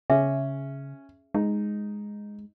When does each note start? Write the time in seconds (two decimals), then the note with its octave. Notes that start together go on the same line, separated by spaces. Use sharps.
0.10 C#3 C#4 G#4 E5 G#5
1.34 G#3 D#4